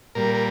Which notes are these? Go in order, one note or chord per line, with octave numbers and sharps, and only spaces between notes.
A#2 G3 A#4
A#4